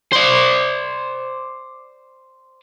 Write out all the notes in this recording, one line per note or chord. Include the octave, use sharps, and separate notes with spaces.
C5 D5